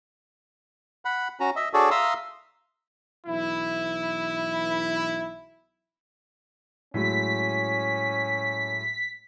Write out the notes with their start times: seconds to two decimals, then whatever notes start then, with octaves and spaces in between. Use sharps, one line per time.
1.05 F#5 B5
1.40 C#4 F#4 A#5
1.56 D#5 E5
1.74 D4 F#4 G#4 A4 C#5 D5
1.91 E5 F5 A#5 C6 D#6 E6
3.27 B1 E3 E4
6.94 A2 F#3 G#3 C#4 B6